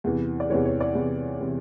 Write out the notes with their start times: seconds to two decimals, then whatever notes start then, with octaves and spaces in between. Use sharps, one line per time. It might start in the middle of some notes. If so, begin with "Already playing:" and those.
0.04 E2 C3 E3
0.40 D5
0.50 E2 C3 E3 C#5
0.66 C#5
0.81 D5
0.95 E2 C3 E3
1.40 C3 E3